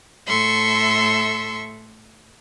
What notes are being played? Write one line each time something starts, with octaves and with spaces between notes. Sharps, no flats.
A2 A4 E5 C6 C#6